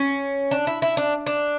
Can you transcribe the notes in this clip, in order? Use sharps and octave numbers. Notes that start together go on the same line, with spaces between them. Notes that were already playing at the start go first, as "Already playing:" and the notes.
Already playing: C#4
D4
E4
E4
D4
D4